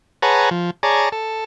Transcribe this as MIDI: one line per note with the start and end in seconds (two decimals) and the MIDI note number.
0.22 0.50 68
0.22 0.50 71
0.22 0.50 73
0.22 0.50 78
0.22 0.50 81
0.22 0.50 82
0.51 0.70 53
0.83 1.09 68
0.83 1.09 73
0.83 1.09 74
0.83 1.09 81
0.83 1.09 82
1.12 1.44 69